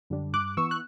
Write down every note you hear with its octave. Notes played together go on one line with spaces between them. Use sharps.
F#2 D3 G3 D4
G2 D6 F#6
E3 B3 C#6 E6
F#6